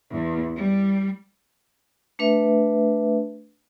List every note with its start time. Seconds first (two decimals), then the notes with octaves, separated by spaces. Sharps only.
0.11 E2
0.56 G3
2.19 A3 D4 B4 E5